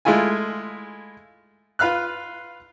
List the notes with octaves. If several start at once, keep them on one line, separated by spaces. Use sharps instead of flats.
G#3 A3 E4 F4 G#5
F4 B4 F5 F6 F#6